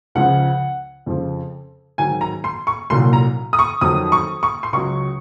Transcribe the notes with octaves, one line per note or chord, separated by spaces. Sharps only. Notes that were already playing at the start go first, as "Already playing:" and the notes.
C#2 C#3 F3 F#5
F2 C#3 F3
G#2 D#3 F#3 G#5
A#5
C6
C#6
C2 A#2 F#3 C6
A#5
D#6
C#6
F2 D#3 F#3 D#6
C#6
C#6
C6
C#2 C#3 F#3 C#6